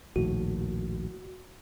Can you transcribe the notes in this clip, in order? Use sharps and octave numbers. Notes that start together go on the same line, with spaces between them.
A#1 D#2 A2 F#4